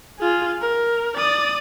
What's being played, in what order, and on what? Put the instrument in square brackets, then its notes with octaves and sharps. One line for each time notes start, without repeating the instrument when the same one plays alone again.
[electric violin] F4 G#4
A#4
D5 D#6